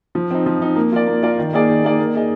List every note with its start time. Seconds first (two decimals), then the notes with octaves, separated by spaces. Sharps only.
0.15 F3
0.31 C4 D#4
0.46 F3
0.62 C4 D#4
0.76 A#3
0.92 F4 A#4 D5
1.07 A#3
1.23 F4 A#4 D5
1.38 D#3
1.53 A#3 D#4 G#4 D5
1.68 D#3
1.84 A#3 D#4 G#4 D5
1.99 A#3
2.14 D#4 G#4 D#5